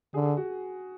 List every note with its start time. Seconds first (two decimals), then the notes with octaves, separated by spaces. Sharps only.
0.14 D3 G#4
0.25 G#4
0.37 F#4